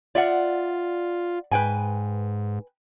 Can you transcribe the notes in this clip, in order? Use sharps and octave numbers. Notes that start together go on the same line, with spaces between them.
F4 D5 E5 F#5
G#2 B4 G5 G#5